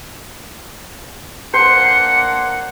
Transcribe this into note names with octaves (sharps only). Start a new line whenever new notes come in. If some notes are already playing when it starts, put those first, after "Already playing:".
A#3 D4 C5 F#5 C#7